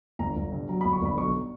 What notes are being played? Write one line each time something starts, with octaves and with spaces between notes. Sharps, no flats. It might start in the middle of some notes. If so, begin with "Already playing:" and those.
G1 A#5
G1
G2
F#3 A#5
B5
G1
C#6
G1 B5
B1 C#6